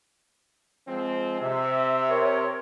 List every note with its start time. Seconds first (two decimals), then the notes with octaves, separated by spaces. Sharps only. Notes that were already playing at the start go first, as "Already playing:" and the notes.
0.88 F3 G#3 C4
1.42 C3 E5
2.10 C4 A#4 C#5